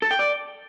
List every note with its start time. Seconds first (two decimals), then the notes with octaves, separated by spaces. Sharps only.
0.02 A4
0.11 G5
0.19 D5